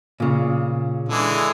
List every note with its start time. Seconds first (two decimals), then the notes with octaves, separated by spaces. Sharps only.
0.20 A#2 C#3
1.09 D3 E3 G#3